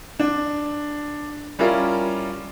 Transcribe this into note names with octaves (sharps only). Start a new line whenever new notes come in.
D4
G3 C#4 E4 F4 A#4 D5